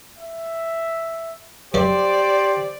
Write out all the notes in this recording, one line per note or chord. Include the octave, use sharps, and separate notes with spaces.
E5
F#2 G3 G4 C5 D5